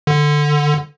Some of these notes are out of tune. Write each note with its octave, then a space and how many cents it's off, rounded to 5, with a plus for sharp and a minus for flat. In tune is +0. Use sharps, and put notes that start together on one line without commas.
D3 +10